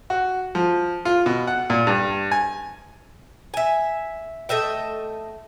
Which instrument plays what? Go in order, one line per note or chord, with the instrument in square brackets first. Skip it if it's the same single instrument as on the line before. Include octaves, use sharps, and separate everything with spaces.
[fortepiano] F#4
F3
F4
B2
F#5
A#2
G2
G#5
[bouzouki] E5 G#5
A3 D#5 E5 G5